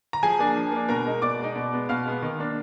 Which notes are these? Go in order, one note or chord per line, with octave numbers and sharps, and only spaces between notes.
A#5
F3 G#4 G#5
A#3 D4
F3
A#3 D4
B2 A#4 A#5
G#3 D#4
B2 D5 D6
G#3 D#4
B2
G#3 B3
B2 F5 F6
G#3 B3
D#3
A#3 D4